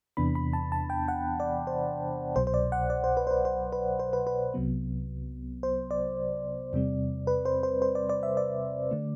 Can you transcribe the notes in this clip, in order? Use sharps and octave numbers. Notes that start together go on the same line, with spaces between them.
E2 C3 E3 B3 D4 B5
B5
A5
A5
G5
F#5
D5
C5
C2 B2 F#3 C5
C5
D5
F#5
D5
C5
B4
C5
B4
C5
B4
C5
B4
B4
C2 C3 F#3 B3
C5
D5
E2 C3 G3 C4
B4
C5
C5
C5
D5
D5
E5
D5
D3 A3